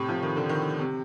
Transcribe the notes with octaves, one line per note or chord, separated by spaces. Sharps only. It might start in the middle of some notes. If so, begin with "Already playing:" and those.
Already playing: A2 C3
F3
D#3
D3
D#3
C3